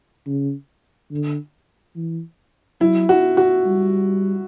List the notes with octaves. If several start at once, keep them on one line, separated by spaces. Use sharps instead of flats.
C#3
D3
E3
F#3 E4
F#4
F#4
G3